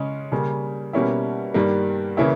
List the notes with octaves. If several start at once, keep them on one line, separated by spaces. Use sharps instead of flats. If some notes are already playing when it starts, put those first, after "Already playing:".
Already playing: C#3 G#3 C#4
C#3 G3 A#3
B2 G3 A#3 C#4 E4
G2 D#3 G3 A#3
C#3 E3 A#3 C#4 E4